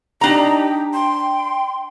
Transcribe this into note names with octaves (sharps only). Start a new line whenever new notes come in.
D4 D#4 G4 A#5
G5 C6